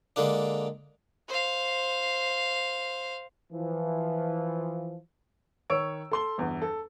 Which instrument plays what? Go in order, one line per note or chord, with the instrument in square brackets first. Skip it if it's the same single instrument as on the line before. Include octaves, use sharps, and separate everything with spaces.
[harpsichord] D3 G#3 A#3 D4
[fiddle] C5 F5
[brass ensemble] E3 F3
[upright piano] D#3 C#5 C#6 E6 D7
A4 C6 G7
G1 E2
A4